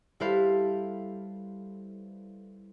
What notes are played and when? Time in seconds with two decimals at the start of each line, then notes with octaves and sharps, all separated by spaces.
0.20 G3 E4 A4 B4 C5 F5